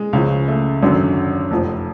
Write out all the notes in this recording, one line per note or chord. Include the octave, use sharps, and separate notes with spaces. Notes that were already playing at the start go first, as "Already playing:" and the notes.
Already playing: G#3
C#2 C#3 F3
A3
G#1 F#2 D3 F#3
F1 F2 F3